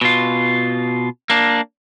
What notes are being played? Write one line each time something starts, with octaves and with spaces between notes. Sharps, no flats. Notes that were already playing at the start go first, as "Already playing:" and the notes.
B2 F4
A#3 D4